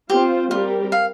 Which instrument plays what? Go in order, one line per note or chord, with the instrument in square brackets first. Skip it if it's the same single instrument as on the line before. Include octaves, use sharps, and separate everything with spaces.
[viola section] C4 F4 C5 [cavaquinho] G4
[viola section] G3 C4 G4 A#4 [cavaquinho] F4
[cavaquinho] F5